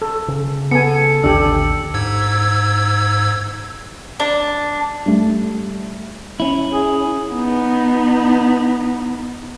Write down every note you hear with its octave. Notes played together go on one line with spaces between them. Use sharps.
A4
C#3
B3 A4 G#5 C#7
A1 D#2 D3 D4 G4 E6
G#2 E6 G#6
D4
G3 A3
C#4 E4
G#4
B3 D#4